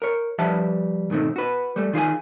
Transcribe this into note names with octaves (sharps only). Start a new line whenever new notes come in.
A#4 C#5
F3 G3 B4 E5 F#5 A5
B1 G#2 D#3 A3 C4
F#4 B4
G3 A3
D#3 F4 G#4 G#5